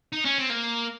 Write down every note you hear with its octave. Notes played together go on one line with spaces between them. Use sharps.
D#4
C#4
C4
A#3